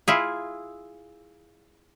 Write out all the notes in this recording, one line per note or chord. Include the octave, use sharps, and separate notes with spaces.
E4 F4 G#4